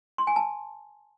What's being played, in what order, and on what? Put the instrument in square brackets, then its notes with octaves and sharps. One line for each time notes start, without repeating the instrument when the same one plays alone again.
[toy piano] C6
G#5
A5